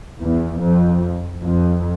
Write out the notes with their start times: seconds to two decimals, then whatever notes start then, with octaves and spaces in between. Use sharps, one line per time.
0.21 E2
0.62 F2
1.44 F2